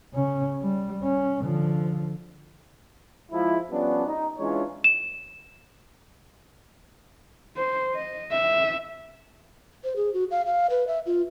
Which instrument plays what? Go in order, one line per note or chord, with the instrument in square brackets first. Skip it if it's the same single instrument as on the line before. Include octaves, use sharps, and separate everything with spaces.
[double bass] C#3 C#4
G3
C#4
D3 F3
[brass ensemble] F3 G#3 E4
F3 G3 B3 C#4 D4
D#4
E3 G#3 C#4 D4 F4 C#5
[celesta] E7
[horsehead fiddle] C5
D#5
E5
[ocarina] C5
G#4
F#4
F5
F5
B4
E5
F4